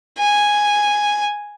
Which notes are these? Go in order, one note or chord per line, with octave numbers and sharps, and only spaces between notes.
G#5